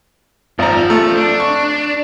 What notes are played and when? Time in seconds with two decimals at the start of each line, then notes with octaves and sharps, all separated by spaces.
0.59 G#1 F3 D5 A#5
0.90 A3
1.15 D4
1.40 C#6